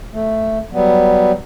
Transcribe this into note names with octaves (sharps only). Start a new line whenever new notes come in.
A3
F#3 G3 B3